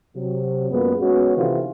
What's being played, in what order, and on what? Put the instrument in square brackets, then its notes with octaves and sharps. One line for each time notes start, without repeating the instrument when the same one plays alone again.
[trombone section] C3 F#3
F#2 A#2 G#3 B3
G#3 B3 C#4 F#4
C3 D#3 E3 A3 F4 F#4